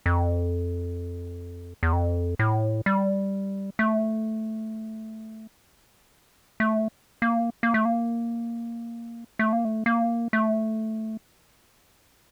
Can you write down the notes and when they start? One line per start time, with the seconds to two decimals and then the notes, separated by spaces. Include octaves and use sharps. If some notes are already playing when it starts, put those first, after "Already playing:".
0.06 F2
1.83 E2
1.93 F2
2.39 A2
2.86 G3
3.79 A3
6.60 A3
7.22 A#3
7.63 A#3
7.74 A3
7.85 A#3
9.39 A3
9.53 A#3
9.65 A3
9.86 A#3
10.33 A3